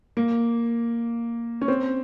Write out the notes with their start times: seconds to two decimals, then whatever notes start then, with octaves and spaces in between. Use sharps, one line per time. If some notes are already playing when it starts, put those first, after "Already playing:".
0.17 A#3
1.61 C#4
1.68 C4